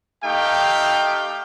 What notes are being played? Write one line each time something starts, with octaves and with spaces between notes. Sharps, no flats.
A3 D#4 G4 F5 G5